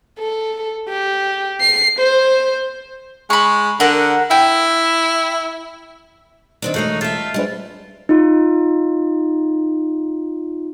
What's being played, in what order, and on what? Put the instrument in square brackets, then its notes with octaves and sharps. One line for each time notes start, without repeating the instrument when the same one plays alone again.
[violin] A4
G4
C7
C5
[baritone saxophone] G#3 [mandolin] B5 C#6
[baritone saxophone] D3 [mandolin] A#4 F#5
[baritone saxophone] E4 [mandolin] G5
[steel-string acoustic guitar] D#3 C4 D4
[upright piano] E1 A3 C7 [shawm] D#4 [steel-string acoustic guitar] F#4 A#4 D#5
[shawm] F4 [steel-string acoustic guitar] A4 E5
[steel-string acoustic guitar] G3 F4 [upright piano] G#3 D4 B4
[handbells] D#4 F4